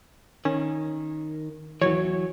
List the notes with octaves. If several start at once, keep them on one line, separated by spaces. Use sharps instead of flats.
D#3 C#4
E2 E3 F#3 C#5